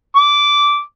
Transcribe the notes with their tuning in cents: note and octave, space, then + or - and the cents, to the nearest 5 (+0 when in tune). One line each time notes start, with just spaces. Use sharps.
D6 -10